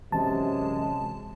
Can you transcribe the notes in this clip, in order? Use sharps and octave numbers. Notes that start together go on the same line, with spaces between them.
F#2 C3 E3 G#3 C#4 A5